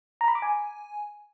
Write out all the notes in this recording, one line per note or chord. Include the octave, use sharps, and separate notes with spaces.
A#5
B5
D6
G#5